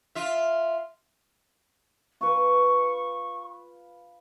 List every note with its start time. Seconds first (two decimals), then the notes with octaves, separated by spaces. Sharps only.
0.15 F4 E5
2.21 F4 B4 C#6